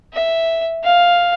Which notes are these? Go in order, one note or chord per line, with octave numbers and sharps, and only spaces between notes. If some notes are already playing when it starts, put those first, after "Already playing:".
E5
F5